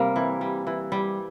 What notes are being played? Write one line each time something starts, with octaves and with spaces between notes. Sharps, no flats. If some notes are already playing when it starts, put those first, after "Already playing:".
Already playing: C3 G3 A#3 C4 A#4
E3
G3
E3
G3